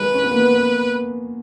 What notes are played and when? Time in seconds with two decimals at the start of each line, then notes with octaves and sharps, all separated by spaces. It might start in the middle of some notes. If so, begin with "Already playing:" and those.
Already playing: D#3 F#3 G#3 B4
0.14 C#4
0.24 B3
0.31 A#3
0.40 B3
0.54 B3